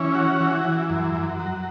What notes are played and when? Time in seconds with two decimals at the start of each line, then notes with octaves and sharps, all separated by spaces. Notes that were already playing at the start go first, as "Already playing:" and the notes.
Already playing: E3 C#4
0.15 F#4
0.40 E3
0.65 E3
0.90 F#2
1.15 F#2
1.40 F#3